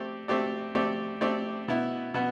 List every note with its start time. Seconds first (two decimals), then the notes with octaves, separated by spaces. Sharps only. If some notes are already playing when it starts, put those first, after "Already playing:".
Already playing: A3 C4 G4 D5
0.28 A3 C4 G4 D5
0.75 A3 C4 G4 D5
1.21 A3 C4 G4 D5
1.68 B2 B3 E4
2.14 B2 B3